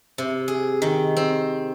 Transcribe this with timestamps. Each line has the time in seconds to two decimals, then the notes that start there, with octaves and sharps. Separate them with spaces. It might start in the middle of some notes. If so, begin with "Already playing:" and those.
0.18 C3
0.48 G#4
0.82 D#3
1.17 C4